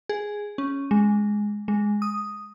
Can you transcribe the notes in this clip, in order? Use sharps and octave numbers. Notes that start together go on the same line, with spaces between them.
G#4
C#4
G#3
G#3
D#6